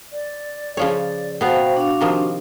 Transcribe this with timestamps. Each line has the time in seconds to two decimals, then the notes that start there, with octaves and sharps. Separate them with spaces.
0.12 D5
0.77 C#3 F3 C#5 D5
1.41 B2 B3 F#4 C5 F5 G5
1.77 D4 F5
2.01 C3 D#3 F3